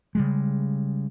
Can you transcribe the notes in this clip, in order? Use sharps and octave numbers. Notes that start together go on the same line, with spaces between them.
C#3 G3 G#3